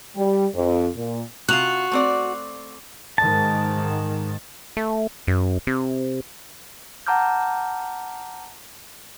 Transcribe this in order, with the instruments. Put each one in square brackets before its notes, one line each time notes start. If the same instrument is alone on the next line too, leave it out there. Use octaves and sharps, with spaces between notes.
[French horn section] G3
F2
A#2
[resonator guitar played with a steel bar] C3 F4 [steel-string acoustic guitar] F#4 [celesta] F#6 F7
[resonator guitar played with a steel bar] A3 C4 D5
[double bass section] G#2 D#3 [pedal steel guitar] A5
[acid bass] A3
F#2
C3
[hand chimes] F#5 A5 A#5 D6 F6 G6